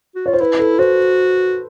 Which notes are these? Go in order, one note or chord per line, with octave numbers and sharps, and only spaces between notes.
F#4
F4 C#5
C5
E4 B4
A4
F#4 C5